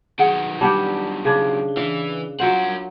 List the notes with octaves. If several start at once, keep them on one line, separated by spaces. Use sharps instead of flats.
D#3 F#3 G#4 F#5
G3 D4 G4 F#5 G#5 A5
C#3 D4
E3 D4 F5
F#3 F4 A#4 C5 F#5